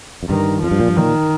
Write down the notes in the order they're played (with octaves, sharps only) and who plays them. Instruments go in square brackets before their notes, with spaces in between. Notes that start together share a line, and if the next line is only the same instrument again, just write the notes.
[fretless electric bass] F2
[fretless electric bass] G2 [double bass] D#3
[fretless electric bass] F2 [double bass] F3
[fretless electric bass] G2
A#2
G2
[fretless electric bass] A#2 [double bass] D#3